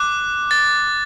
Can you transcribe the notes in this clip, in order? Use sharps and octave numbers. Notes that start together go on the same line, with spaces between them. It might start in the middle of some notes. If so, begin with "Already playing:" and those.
Already playing: D6 F#6
A6